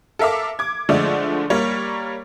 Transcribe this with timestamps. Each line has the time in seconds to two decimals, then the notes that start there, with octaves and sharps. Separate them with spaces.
0.19 A4 A#4 E5 F5 D6
0.59 D6 G#6
0.89 D3 F3 G#3 A3 D5
1.50 G3 A#3 C#5